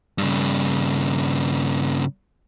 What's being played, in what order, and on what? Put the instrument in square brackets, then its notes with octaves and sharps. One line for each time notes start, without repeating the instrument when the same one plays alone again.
[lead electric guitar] G2 C#3